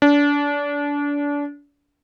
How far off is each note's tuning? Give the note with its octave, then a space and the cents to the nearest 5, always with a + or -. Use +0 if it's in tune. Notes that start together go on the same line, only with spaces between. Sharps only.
D4 -30